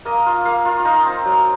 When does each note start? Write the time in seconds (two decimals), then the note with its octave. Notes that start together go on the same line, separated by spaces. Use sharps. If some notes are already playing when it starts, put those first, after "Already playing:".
0.05 A#3 D#5
0.26 F4
0.45 A#3 F5
0.65 F4
0.85 D#4 A#5
1.05 C4
1.25 F#3